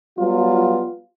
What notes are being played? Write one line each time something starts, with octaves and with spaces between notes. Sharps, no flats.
F#3 G3 B3 F4